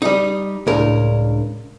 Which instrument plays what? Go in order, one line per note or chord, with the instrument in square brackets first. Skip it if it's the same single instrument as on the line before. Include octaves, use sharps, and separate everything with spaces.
[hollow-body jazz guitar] G3 D#4
[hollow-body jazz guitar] C#2 A#4 [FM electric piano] A2 D4